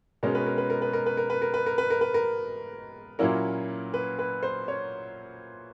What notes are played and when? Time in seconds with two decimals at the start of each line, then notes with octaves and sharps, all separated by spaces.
0.23 B2 G#3 C#4 A#4
0.35 B4
0.47 A#4
0.58 B4
0.70 A#4
0.82 B4
0.93 A#4
1.06 B4
1.17 A#4
1.30 B4
1.42 A#4
1.54 B4
1.66 A#4
1.78 B4
1.90 A#4
2.01 B4
2.14 A#4
3.19 A#2 F#3 A#3 C#4 E4 A#4
3.94 B4
4.19 B4
4.43 C5
4.68 C#5